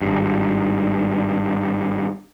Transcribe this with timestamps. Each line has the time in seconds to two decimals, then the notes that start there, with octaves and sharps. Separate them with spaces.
0.02 G#1 G2